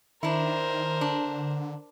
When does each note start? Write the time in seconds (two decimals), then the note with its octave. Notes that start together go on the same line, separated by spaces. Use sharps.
0.23 D#3 D4 E4 A#4 C5
1.01 D3 D4